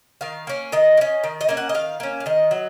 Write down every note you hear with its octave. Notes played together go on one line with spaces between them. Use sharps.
D#3 F5
A#3 C#4
D#3 D#5
A#3
C#4
D#3
D#5
A#3 C#4
F#5
D#5
D#3 F5
A#3 C#4
F5
D#3 D#5
F#3